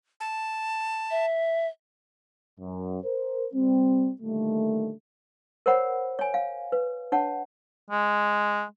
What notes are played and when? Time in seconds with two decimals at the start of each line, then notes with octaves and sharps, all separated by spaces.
0.20 A5
1.11 E5
2.60 F#2
3.03 A#4 C5
3.54 G3 C4
4.21 A#2 D3 D#3 G3 A3
5.66 A#4 C5 C#5 F#5 B5
6.19 C#5 G#5
6.34 F5
6.72 B4
7.12 D4 C#5 F#5 A5
7.90 G#3